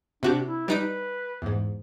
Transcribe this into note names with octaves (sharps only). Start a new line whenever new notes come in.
C3 D4 F#4 G4
E4
G3 D#4 B4 D7
E2 G#2